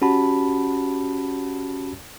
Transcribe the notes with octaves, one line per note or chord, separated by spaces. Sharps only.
C#4 F#4 G4 F#5 A5 B5